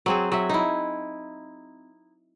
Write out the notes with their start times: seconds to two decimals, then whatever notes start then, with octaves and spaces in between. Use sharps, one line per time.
0.06 F#3 C4 G#4
0.32 F#3 E5
0.50 D#4 E4